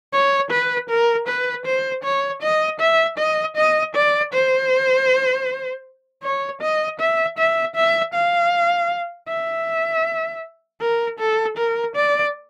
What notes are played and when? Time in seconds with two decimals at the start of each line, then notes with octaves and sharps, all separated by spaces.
0.13 C#5
0.51 B4
0.90 A#4
1.28 B4
1.66 C5
2.04 C#5
2.42 D#5
2.80 E5
3.18 D#5
3.56 D#5
3.95 D5
4.33 C5
6.23 C#5
6.62 D#5
7.00 E5
7.38 E5
7.76 E5
8.14 F5
9.29 E5
10.82 A#4
11.19 A4
11.58 A#4
11.96 D5